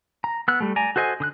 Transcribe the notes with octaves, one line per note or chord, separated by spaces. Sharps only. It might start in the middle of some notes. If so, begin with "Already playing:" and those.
A#5
B3 E6 F#6
G3 A3
D5 G#5 A#5
F#4 A4 C5 D#5 G#5
D3 D#6 F#6